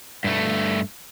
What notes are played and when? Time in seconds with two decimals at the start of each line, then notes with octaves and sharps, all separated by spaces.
0.24 G2 A3